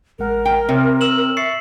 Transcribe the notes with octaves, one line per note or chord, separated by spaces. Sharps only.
A1 G#3 A#4 F#5
G5
C3 C4 C#5
E6 E7 F#7
E5 C#6 A6 C7 C#7